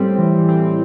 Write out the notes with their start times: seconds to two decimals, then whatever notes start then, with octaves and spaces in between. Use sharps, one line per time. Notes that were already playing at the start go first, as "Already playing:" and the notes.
Already playing: A2 G3 C4
0.18 E3
0.49 C4